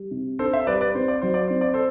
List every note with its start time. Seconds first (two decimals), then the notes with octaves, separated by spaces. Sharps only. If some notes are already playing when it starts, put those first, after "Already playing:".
Already playing: G3
0.11 C3
0.39 D4 A4 C5
0.53 C5 E5
0.67 G3 B4 D5
0.81 B4 D5
0.95 C4 C5
1.08 D5
1.22 F#3 C5
1.34 D5
1.48 C4 C5
1.61 D5
1.74 A4 C5